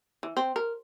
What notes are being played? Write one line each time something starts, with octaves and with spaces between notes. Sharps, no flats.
E3
C4
A#4